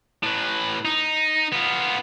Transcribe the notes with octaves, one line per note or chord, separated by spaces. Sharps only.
A2 B4
D#4
B3 F4